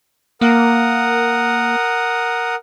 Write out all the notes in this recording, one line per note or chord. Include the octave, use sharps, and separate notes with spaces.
A#3 A#4 F#5 D#6